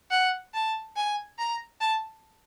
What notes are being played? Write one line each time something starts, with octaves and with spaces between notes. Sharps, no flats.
F#5
A5
G#5
A#5
A5